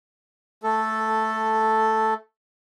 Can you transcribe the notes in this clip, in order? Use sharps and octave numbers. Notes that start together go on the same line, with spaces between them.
A3 A4